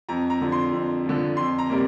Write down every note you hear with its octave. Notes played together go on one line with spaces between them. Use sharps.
F2 A#5
A#5
D3 F3
C6
F2
D3 F3
F2 C6
A#5
C3 G3 A#3